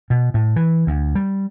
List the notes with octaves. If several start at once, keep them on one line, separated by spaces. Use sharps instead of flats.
B2
A2
E3
D2
G3